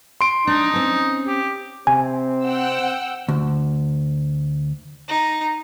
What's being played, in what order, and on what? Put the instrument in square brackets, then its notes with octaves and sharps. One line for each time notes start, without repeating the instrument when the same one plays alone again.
[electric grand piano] C6 D7
[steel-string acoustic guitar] D4 [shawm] D#4
[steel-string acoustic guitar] C4 C#4
[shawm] G4
[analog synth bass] C3 [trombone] C4 [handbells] G#5
[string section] F#5 G5 E6
[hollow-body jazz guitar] D2
[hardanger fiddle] D#4